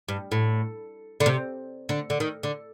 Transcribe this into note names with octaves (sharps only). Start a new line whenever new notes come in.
G2
A2
D3
C3
D3
D3
D#3
D3